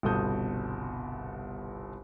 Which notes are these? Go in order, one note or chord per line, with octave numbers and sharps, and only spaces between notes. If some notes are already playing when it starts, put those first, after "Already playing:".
G1 C2 B2 A4 D#6 G6